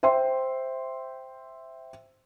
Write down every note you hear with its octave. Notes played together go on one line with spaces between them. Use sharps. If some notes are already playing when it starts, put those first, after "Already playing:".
C5 E5 G5 C6